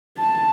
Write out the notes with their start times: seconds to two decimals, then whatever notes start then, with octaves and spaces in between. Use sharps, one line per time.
0.18 A5